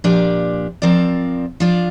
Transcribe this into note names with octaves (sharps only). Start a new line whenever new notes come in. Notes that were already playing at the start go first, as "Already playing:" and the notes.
A#2 F3 D4 G4 D5
F3 C4 A#4 D5
F3 D4 F4 D5